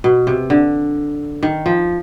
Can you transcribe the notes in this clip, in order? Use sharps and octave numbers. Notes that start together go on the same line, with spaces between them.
B2
C3
D3
D#3
F3